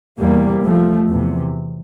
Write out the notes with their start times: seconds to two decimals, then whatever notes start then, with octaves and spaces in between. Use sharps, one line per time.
0.19 E2 C3 G3 A#3
0.64 F3 A3
1.09 E2 C3